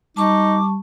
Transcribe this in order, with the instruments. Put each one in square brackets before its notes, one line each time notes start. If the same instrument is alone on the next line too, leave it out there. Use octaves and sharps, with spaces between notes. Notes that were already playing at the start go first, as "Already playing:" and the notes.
[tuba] G3 [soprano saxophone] D#4 [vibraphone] A5 C#6 [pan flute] D6